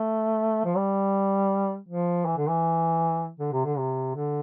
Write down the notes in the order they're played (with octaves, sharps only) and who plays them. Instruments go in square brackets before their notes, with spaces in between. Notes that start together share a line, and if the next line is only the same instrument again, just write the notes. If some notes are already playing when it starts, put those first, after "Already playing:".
Already playing: [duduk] A3
F3
G3
F3
E3
D3
E3
D3
C3
D3
C3
D3